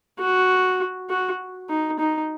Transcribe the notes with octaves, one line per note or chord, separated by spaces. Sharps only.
F#4
F#4
D#4
D#4